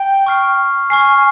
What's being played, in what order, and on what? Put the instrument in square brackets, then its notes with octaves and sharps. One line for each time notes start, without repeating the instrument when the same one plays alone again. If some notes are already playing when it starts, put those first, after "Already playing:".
Already playing: [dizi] G5
[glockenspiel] C#6 F6 C7
[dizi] G#5 [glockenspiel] C#6 F6 C7
[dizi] G#5